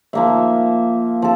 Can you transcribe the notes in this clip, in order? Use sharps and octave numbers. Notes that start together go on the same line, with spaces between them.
F3 A#3 E5
F3 A4